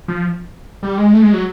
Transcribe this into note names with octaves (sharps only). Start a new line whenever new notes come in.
F3
G3
G#3
A3
G#3
F#3